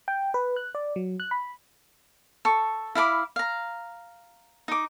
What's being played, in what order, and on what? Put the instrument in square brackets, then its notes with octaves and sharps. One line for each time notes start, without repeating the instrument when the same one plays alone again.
[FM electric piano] G5
B4
F#6
D5
F#3
F#6
B5
[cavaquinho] A4 C#6
E4 F5 B5 D6
F5 A#5
D#4 D6